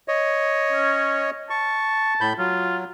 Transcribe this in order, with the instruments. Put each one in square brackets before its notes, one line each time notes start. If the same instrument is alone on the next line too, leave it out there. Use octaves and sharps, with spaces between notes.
[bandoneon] C#5 D#5
[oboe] C#4
[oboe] A5 [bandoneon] C#6
[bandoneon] A2 B5 G6
[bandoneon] F#3 [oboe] F4